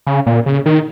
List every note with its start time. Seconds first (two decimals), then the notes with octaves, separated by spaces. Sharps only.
0.06 C#3
0.26 A#2
0.46 C#3
0.66 D#3